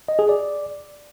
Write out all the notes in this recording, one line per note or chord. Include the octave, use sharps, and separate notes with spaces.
D#5
G#4
D5